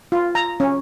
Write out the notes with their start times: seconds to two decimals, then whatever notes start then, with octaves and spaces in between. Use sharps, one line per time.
0.12 F4
0.35 A#5
0.60 C#4